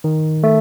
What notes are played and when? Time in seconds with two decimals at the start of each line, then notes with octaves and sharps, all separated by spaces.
0.04 D#3
0.43 A3